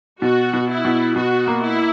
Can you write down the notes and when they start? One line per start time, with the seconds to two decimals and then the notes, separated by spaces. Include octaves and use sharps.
0.22 B2 F#4
0.53 B2
0.70 E4
0.85 B2
1.16 B2 F#4
1.47 A#3
1.62 E4